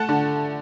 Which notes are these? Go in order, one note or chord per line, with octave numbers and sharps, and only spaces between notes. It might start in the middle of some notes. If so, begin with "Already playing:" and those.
Already playing: A3 F#5 A5
D3